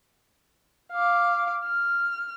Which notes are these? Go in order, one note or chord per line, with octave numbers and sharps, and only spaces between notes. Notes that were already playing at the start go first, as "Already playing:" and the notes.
F5 D6
F6